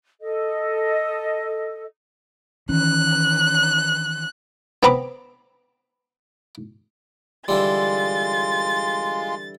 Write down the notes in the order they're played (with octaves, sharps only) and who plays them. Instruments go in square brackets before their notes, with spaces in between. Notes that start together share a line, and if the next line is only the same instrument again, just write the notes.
[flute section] A4 D#5
[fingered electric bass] D#3 E3 C#4 [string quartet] F#6
[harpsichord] B3 C4 A#5 B5 D6
[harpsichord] D3 E3 G3 [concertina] G#3 F4 C6 [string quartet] A6